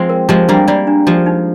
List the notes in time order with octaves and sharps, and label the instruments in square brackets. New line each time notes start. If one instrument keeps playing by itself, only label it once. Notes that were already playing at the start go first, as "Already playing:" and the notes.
Already playing: [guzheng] F3 G#3 C4
[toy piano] A#4
[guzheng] F3 G#3 [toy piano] G4
[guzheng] G3 A#3 [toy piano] D4
[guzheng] G3 A#3 [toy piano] D5
[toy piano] D4
[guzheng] F3 G#3 [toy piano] G4
[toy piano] D#4